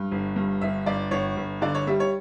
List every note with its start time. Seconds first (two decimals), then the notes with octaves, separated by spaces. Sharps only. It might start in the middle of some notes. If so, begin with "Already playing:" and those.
Already playing: G2
0.11 G1
0.36 G2
0.61 G1 E5
0.86 G1 D5
1.11 G1 C#5
1.37 G1
1.62 D3 D5
1.75 C#5
1.87 G3 E5
2.00 C#5